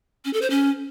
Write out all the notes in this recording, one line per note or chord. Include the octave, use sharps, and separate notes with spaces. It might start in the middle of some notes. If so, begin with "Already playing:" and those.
C#4
A4
C5
C#4